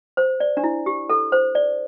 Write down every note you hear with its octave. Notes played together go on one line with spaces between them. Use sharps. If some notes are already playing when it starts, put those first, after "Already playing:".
C5
D5
D4
E4
G4
A4
C5
D5